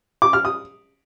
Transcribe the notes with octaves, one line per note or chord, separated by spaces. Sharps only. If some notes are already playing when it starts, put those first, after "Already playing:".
D6
F6
D#6